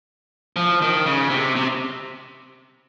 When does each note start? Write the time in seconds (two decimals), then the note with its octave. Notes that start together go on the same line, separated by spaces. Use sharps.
0.56 F3
0.82 D#3
1.06 C#3
1.30 C3
1.56 C3